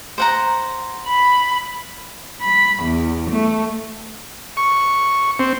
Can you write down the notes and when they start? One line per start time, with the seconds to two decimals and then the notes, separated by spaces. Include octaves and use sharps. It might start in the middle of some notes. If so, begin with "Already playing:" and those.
0.18 C5 F#5 A#5
1.07 B5
2.43 B5
2.84 E2
3.31 A3
4.57 C#6
5.39 C4